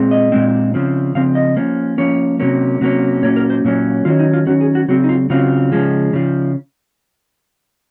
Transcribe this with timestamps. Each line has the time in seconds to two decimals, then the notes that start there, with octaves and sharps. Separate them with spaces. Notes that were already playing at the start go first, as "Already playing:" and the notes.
Already playing: A#2 G#3 C4
0.11 D#5
0.32 A#2 G#3 C4
0.74 C#3 F3 C4
1.15 C#3 F3 C4 F5
1.35 D#5
1.56 F3 A#3 C#4
1.98 F3 A#3 C#4 C#5
2.40 C3 F#3 A#3 C#4
2.81 C3 F#3 A#3 C#4
3.22 A#2 F#3 A#3 C#4 C#5
3.36 A#4
3.50 C5
3.64 A#2 F#3 A#3 C#4
4.05 D#3 F#3 C#4 F4
4.19 D#4
4.33 F4
4.47 D#3 F#3 C#4 F#4
4.61 G#4
4.75 F#4
4.88 C#3 F#3 C4 F#4
5.04 D#4
5.09 F4
5.30 C#3 F#3 C4 F4
5.72 C#3 F3 G#3
6.13 C#3 F3